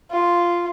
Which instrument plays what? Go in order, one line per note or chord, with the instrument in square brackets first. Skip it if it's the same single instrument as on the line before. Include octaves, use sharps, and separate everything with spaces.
[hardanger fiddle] F4